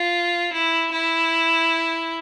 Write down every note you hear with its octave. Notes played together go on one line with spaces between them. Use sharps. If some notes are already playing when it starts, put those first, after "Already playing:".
Already playing: F4
E4
E4